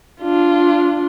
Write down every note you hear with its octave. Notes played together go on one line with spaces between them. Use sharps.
D4 F4